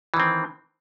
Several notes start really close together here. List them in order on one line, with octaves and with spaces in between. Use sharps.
E3 D#3 C4